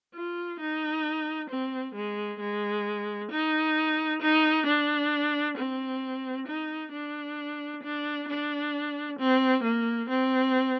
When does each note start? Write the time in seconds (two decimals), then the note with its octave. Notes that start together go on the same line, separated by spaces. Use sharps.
0.14 F4
0.60 D#4
1.50 C4
1.95 G#3
2.40 G#3
3.31 D#4
4.22 D#4
4.67 D4
5.58 C4
6.48 D#4
6.93 D4
7.83 D4
8.28 D4
9.19 C4
9.64 A#3
10.10 C4